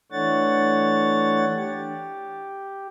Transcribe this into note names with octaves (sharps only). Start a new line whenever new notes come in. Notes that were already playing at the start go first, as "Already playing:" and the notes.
E3 A3 D4 C#5 F#5 A6
G4